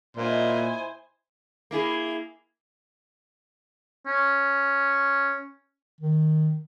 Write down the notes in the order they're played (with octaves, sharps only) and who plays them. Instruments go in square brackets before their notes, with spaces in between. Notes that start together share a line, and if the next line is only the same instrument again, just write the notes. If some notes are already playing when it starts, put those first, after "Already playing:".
[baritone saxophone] A#2 [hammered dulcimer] E4 D#5 [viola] C5 G#5
[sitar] A#3 E4 G#4
[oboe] C#4
[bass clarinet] D#3